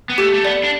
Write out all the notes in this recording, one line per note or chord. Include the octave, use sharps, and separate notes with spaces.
B3
A3 G4
A3
B3 D5
D4